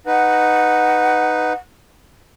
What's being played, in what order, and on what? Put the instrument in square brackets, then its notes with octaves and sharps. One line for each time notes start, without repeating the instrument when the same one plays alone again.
[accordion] D#4 B4 [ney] F#5